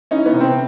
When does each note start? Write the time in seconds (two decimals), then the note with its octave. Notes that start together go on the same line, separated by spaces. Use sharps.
0.11 E3 C#4 D#4
0.26 B3 C#4
0.33 C3
0.41 C4